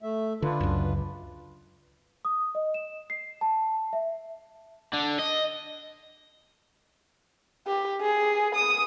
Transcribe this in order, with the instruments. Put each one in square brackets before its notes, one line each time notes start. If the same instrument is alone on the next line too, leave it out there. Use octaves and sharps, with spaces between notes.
[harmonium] A3 E5
[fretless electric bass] D3 [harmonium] D4 F4 B4
[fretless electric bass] C#2 F#2
[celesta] D#6
D#5
E7
C7
A5
E5
[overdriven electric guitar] D3
D#5
[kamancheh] G4
G#4
D#6